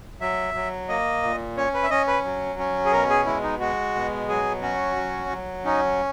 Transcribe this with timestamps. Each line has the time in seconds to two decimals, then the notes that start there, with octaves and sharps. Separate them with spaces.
0.21 F#3 E5
0.54 F#3
0.88 A#3 D#5
1.23 A#2
1.57 C#4 C#5
1.74 B4
1.83 E5
1.90 C#4 D#5
2.07 B4
2.24 F#3
2.59 C#4
2.85 G#4
2.92 B2 A#4
3.09 G#4
3.26 G#3 E4
3.43 D#4
3.60 G#3 F#4
3.95 B2
4.28 F#3 G#4
4.62 C#4 F#4
4.96 F#3
5.30 F#3
5.65 C#4 D#4